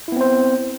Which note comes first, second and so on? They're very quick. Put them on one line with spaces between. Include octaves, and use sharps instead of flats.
E4 B3 C4 C5